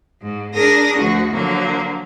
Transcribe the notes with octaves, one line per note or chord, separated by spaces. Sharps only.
G#2
D4 G#4 A#4 D#6 A#6
D2 F3 F#4
D3 F3 F#3 A#3